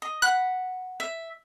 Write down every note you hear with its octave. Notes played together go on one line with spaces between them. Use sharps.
D#5
F#5 B5 F#6
E5